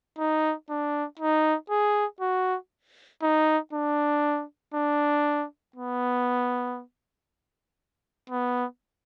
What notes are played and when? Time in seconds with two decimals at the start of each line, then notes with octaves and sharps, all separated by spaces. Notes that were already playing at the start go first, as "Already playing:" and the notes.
0.19 D#4
0.69 D4
1.20 D#4
1.70 G#4
2.21 F#4
3.23 D#4
3.73 D4
4.74 D4
5.76 B3
8.30 B3